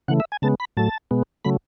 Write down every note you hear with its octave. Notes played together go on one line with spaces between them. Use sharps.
C#3 E3 A3 F#5
E5
G#5
C#3 G#3 B3 A5
B5
A2 F#3 A3 A5
B2 G#3 B3
C#3 F#3 A3 B5